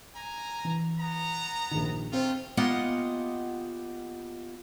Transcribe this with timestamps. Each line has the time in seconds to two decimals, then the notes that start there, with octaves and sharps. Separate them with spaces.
0.15 G#5 A#5
0.65 E3
0.98 B3 A#5
1.71 A#1 D#3
2.13 A3 C4 D#4 F4 C5
2.57 A#3 B3 F4 G4 D#5 F#5